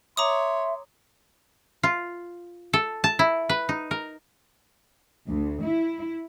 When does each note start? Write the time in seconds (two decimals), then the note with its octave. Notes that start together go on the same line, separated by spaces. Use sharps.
0.17 C#5 E5 A#5 C6 D6 D#6
1.83 F4
2.73 A4
3.04 A5
3.19 E4
3.49 B4
3.69 D#4
3.91 A#4
5.27 D2
5.62 E4